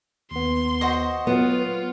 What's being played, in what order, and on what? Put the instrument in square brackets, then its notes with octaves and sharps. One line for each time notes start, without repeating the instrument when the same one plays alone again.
[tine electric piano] D#2 B3 [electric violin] C6
[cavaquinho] F#4 C5 D#5
[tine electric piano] F#3 [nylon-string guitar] B3 [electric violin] F4